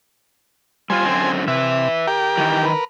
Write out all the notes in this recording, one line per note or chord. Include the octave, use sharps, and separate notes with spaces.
G3 F4 C5 G#5
F#2 D3 C4
C3 B4 E5
G4 A#4 G5
D#3 E3
A#4 B4